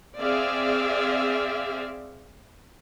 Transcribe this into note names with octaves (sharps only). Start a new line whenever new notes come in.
C4 G#4 D5 E5 F5